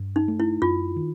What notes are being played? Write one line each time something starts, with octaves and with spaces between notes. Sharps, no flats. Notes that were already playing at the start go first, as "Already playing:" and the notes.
Already playing: G2
D#4
A3
E4
F#2 F4
D#3